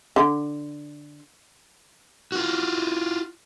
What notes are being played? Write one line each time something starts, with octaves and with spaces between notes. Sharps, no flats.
D3
F4 F#4